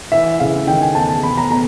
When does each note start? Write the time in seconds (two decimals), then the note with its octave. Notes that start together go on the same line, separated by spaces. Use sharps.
0.12 E3 E5
0.40 C#3 F5
0.67 D#3 G5
0.82 G#5
0.95 E2 A5
1.09 A5
1.23 B2 B5
1.37 A#5
1.51 B2 A#5